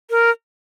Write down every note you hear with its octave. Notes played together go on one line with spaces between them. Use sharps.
A#4